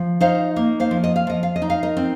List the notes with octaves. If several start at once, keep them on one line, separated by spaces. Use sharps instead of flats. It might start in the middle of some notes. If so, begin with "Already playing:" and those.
Already playing: F3
D#4 C5 F5
A#3
C5 F5
F3
D#5
F5
F3 D#5
F5
D#5
D#4
F5
A#4 D#5
C4